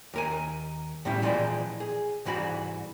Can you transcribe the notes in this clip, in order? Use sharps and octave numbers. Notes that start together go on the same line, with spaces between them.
D#2 A#4 G#5
A2 G3 C#4 E4
A#2 E3 F3 G#3 D5 G5
G#4
C2 G#2 E3 F#4 B5